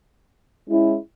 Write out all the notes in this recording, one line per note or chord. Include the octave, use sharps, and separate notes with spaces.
G#3 C#4 E4